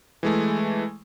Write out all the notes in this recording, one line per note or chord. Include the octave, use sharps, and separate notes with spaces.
E3 G#3 A3